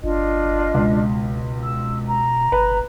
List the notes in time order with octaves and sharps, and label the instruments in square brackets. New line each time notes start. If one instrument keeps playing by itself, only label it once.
[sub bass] G1 [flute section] D4 F4 D#5
[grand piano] C#2 [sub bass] B2
[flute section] E6
A#5
[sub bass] G1 [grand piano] B4